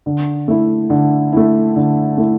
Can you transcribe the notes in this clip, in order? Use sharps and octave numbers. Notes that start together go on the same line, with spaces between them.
D3
A3 E4
D3
A3 E4
D3
A3 E4